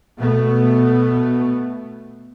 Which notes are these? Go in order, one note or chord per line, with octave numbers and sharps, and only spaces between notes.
B2 A3 B3